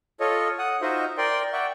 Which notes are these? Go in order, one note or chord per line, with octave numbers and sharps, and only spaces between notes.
F4 A4 C#5 D#5
F#5 D#6
D#4 F4 F#4 C5 D#5 E5
A#4 D5 G5 C6
D5 E5 F#5 G5 C#6